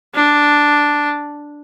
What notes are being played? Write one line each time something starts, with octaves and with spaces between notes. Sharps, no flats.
D4